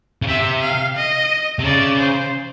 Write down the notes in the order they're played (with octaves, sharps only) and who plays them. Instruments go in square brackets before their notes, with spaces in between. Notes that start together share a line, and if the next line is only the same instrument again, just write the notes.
[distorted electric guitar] C#3
[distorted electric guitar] C3 [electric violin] E5
[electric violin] F5
D#5
[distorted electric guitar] C3
[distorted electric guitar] C#3 [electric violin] D5
[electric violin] C5